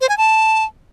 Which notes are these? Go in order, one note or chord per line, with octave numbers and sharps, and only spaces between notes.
C5
G#5
A5